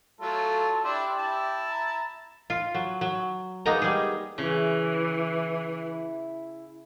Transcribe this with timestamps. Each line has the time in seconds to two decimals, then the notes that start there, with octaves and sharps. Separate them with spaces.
0.21 F#3 A3 F4 A4
0.84 D4 E4 G4 C6
1.18 E4 A5
1.71 A#5
2.50 F4
2.75 F#3
3.01 F#3
3.66 G#3 A#3 B3 D#4 D#5 A#5
3.82 G3 G#4
4.38 C#3 E3 E4